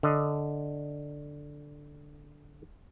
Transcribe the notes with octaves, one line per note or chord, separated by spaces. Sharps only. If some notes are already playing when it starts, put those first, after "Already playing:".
D3 D#5